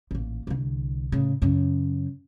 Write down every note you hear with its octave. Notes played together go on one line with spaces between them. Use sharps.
A1 A#2
C2 D3
A2 C#3
F#2 C#3